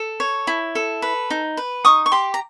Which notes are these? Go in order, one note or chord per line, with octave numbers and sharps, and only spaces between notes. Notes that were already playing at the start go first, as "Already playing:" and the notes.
Already playing: A4
C#5
E4
A4
B4
D#4
B4
D#4 C#6 D#6
C#6
G4 C6 D6
A#5